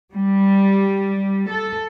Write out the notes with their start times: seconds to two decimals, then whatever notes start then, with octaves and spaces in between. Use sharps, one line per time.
0.13 G3
1.48 A4